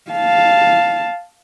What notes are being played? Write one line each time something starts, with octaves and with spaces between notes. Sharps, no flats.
F5 A5